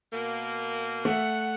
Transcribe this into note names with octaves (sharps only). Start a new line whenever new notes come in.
B2 A#3
A3 E5 F#5